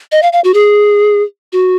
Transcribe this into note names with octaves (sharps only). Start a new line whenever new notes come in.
D#5
F5
F5
F#4
G#4
F#4